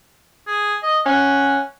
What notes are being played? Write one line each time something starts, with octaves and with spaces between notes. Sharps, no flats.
G#4
D#5
C#4 F#5